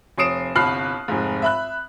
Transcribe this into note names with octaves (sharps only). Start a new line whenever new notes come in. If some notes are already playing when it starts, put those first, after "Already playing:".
F1 C#5 D#6 C7 D7 E7
G1 C2 B5 F6 F#6 C7
F1 G#2
E5 B5 F#6